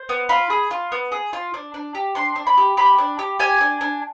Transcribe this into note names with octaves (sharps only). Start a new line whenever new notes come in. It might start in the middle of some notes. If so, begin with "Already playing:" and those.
Already playing: C5
B3
F4 B5
G#4
F4
B3
G#4
F4
D4
D4
G4
D4 C6
D4
B5
G4
G4 B5
D4
G4
G4 G#5
D4
D4